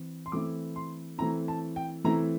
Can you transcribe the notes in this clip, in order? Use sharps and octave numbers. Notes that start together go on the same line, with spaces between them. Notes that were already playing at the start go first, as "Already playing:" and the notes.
Already playing: E3 C4 E4
C6
E3 A3 C4 E4 D6
C6
E3 A3 C4 E4 A#5
A5
G5
E3 A3 C4 E4 A#5